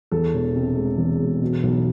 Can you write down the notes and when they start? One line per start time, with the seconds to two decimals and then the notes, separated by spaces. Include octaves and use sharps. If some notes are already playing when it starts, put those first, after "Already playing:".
0.12 E2 A4
0.34 E1
0.55 C3
0.77 G#3
0.98 E2
1.20 E1
1.41 B2
1.63 B1